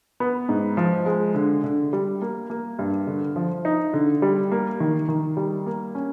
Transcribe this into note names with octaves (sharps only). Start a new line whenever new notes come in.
B3
G#2
F3
G#3
D3
D3
G3
A#3
A#3
G2
D3
F3
D#4
D3
G3
A#3
D#3
D#3
G3
A#3
C#4